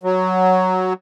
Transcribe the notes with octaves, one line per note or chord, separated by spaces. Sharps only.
F#3